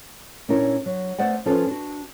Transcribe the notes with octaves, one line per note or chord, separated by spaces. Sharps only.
A#2 C#4 D4 E4 A#4 C#5
F#3
A3 B3 C5 D5 F#5
F3 C#4 F4 A4 B4 C#5
D4 F#4